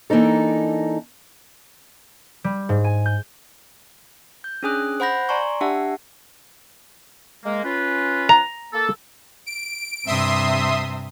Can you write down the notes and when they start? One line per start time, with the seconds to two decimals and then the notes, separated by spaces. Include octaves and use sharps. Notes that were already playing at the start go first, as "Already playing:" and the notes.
0.10 E3 A#3 D4 D#4 A4
2.44 G3
2.69 G#2
2.84 G#5
3.06 G6
4.44 G6
4.63 C#4 D4 G#4 G#5 D#6 F#6
5.00 C5 F#5 B5 G6 A#6
5.29 D5 G#5 A#5 C6 C#6
5.61 D4 G4 E5 F#5 A5
7.45 G#3 A#3
7.64 C#4 F4 B4
8.29 A#5
8.73 A#3 A4
9.46 D7
10.07 G2 C3 E5 C6 D#6